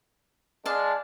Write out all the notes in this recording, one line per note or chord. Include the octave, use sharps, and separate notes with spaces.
G#3 D4 F5 A5